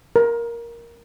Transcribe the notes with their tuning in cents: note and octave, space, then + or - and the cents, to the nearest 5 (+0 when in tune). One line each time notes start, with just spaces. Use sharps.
A#4 +5